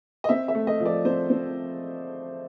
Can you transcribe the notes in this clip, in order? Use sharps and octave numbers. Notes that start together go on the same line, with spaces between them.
D#5
C4 E5
E5
A3
D#5
F3
D5
C4 C5
C4